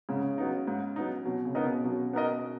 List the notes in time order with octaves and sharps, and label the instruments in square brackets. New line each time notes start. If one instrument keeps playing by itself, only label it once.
[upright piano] G#2 [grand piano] C#3
[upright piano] F#3 B3 D#4
G#2
F#3 B3 D#4
[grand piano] B2 [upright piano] F#3
[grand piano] C#3
[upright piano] B3 D#4 A#4 D#5
[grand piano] B2
[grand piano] B2 [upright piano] F#3
[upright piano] B3 D#4 A#4 D#5